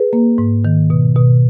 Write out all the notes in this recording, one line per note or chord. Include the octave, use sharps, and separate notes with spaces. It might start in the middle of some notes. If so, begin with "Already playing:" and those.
Already playing: G#4 B4
A#3
G#2
D#3
B2
B2